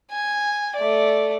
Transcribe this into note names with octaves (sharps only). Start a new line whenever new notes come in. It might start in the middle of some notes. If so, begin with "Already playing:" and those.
G#5
A3 D5